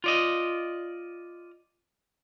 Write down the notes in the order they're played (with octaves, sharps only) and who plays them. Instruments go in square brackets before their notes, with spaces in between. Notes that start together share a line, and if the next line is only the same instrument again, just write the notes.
[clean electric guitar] F4 D5 D#5